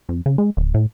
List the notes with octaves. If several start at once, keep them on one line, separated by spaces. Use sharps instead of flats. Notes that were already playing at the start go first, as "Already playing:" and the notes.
F2
C#3
G#3
D1
A2